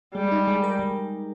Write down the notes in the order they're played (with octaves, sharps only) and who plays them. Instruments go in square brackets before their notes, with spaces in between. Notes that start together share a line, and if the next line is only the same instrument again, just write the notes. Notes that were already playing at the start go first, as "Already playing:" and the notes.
[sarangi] G3 [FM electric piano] G#3
[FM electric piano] D#4
G#3
A#4
G#3